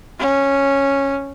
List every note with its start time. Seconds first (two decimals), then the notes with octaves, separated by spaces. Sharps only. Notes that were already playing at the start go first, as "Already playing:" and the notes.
0.19 C#4